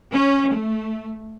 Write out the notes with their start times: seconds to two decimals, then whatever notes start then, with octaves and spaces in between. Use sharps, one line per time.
0.12 C#4
0.50 A3